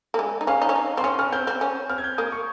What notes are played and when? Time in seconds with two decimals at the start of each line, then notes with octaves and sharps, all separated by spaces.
0.14 A#3
0.19 G#3
0.41 D#4
0.47 C#4 F5
0.62 D#4
0.69 C#4
0.76 D#4
0.97 C4 C6
1.04 C#4 C#6
1.19 C#4 F6
1.32 C4 G6
1.47 C4
1.61 C#4
1.89 C4 F6
1.98 G#6
2.04 G6
2.18 A#3 D#6
2.32 C#6